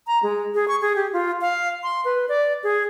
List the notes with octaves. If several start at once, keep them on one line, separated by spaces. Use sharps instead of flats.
A#5
G#3
G#4
C#6
G#4
G4
F4
F5
C6
B4
D5
G#4